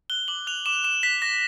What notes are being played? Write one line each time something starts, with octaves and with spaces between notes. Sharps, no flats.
F#6 G7
D6 F#7
F#6 F7
D6 E7
D6 E7
F#6 B6
D6 A#6